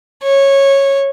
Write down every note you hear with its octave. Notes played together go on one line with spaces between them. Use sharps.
C#5